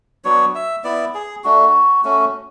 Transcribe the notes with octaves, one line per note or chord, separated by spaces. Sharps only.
F#3 B3 D4 F#4 C#5
E5
B3 E4 D5
G#4
A3 D4 F#4
A3 C#4 F#4